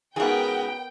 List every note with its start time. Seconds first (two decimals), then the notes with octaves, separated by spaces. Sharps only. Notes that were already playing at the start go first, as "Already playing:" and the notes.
0.16 G#2 C#3 B3 F#4 G#4 A#4 G5